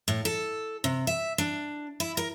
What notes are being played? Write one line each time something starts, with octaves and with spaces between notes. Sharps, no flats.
A2
A4
C3
E5
D4
E4
A#4